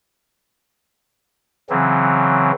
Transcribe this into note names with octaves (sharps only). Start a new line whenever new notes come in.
C#3 E3 F#3 C4